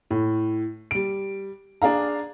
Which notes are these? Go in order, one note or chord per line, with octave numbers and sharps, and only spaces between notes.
A2
G3 D7
D4 G#4 F5 A#5